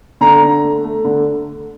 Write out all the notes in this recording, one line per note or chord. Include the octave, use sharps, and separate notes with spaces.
D3 A#5
D3
A3
A3
D3